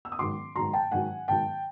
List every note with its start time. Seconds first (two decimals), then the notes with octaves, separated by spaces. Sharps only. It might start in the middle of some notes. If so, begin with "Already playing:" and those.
0.05 E6
0.12 D#6
0.19 G#2 D#3 F#3 C6 D6
0.56 G#2 D#3 F#3 A#5 C6
0.73 G5 A5
0.92 G#2 D#3 F#3 F#5 G#5
1.28 G#2 D#3 F#3 G5 A5